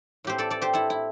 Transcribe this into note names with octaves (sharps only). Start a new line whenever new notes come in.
A2 A3 C4 G4 C5
A4 D5
A4 D5
G4 C5
E4 A4
E4